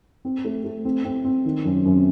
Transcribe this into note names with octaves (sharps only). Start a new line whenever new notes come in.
C4
A3
A3
C4
C4
C4
D#3
F#2
F#2